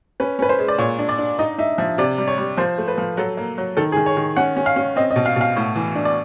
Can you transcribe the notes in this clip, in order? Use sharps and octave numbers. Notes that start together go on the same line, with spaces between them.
C#4 B4
C#4 B4
C5
G#3
D5
A#2 C#5
D4
D5
D4
D#4 D#5
D#4 E5
F3 E5
C3 D5
G3
C#5
G3
F3 C5
A3
B4
F3
F#3 A4
A#3
F#3
D#3 A4
G#4
D#3
C#5
D#3
C#4 F#5
C#4
F5
C#4
C4 D#5
D#5
B2
F5
B2 F5
A2
E3
D4
D5